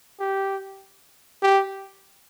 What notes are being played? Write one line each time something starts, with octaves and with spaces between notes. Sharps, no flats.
G4
G4